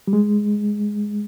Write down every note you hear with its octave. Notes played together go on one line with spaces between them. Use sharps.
G3
G#3